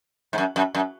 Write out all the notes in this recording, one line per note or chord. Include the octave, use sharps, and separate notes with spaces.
G#2
F#2
F#2
F#2